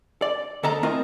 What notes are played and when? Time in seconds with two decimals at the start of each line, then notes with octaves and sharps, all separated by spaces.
0.22 D5
0.63 D2 A4 D#5 A5 A#5
0.83 A3 C4 E4 F4 A#4 D#5